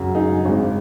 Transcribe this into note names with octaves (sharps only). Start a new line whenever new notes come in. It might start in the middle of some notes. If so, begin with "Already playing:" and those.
Already playing: F#2 C#3 F#3
D#4 G#4
G#1 G#2 G#3